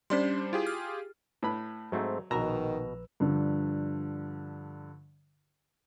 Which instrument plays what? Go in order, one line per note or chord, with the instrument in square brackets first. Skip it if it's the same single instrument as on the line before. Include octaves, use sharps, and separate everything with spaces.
[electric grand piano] G3 D4 C5 [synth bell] C#4 D5 C6
[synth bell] E4 [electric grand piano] F4 G4 G#4
[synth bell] F6
[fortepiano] A2 B4 B5
[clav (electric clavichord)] G#2 A3 C4 [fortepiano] F#3
[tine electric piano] A#1 B4 E6 [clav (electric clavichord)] B2 [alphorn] D#3 [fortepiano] A#5
[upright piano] G2 D3 F3 D4